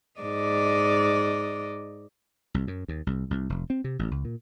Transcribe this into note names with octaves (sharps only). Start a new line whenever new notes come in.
G#2 D5 D#5
C2
F#2
D#2
C2
C2
F1
C4
C3
A1
C#2
A#2